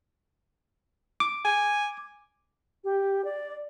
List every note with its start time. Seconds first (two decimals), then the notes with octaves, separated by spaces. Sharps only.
1.20 D6
1.45 G#5
2.84 G4
3.24 D5